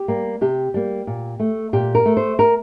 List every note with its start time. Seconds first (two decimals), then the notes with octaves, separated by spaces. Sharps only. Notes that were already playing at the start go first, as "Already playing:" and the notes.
Already playing: G4
0.08 G3 A#3
0.41 C3 G4
0.74 G3 A#3
1.07 A#2
1.40 A3
1.73 A#2 G4
1.95 A#4
2.06 A3
2.17 C5
2.39 A#4